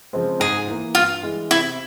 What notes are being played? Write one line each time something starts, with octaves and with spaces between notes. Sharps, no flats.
C#3 F3 G#3 C4
G#2 G#4
E3 A#3
G2 F4
E3 G#3
C3 E4